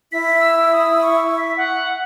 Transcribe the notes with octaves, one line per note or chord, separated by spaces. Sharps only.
E4 B6
E6
D#6
C#6
B6
F#5